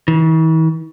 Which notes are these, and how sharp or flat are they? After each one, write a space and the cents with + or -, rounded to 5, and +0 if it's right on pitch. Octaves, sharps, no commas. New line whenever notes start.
E3 -45